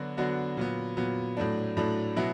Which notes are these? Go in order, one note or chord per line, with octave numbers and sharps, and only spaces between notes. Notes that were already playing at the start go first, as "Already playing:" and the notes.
Already playing: D3 F#3 B3 D4 F#4
D3 F#3 B3 D4 F#4
A#2 F#3 B3
A#2 F#3 B3
A2 F#3 A3 D4
A2 F#3 A3 D4
B2 F#3 B3 E4